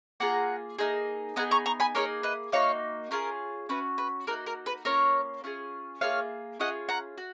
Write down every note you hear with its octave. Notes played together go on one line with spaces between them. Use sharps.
A#3 F4 G#4 F#5 A#5
A#3 D#4 G#4
B3 D#4 G#4 F#5 A#5
A#5 C#6
A#5 C#6
G#5 B5
A#3 D#4 G#4 A#4 C#5
B4 D#5
A#3 D#4 F#4 C#5 F5
C#4 F4 G#4 A#4
C#4 F#4 B4
B4
A#3 D#4 F#4 A#4
A#4
B4
A#3 C#4 F4 A#4 C#5
C#4 F4 G#4
A#3 F4 G#4 C#5 F5
C#4 F4 G#4 D#5 F#5
F#5 A#5
F#4